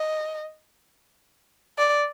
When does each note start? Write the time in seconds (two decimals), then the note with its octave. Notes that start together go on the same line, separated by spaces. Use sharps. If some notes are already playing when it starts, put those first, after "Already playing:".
Already playing: D#5
1.78 D5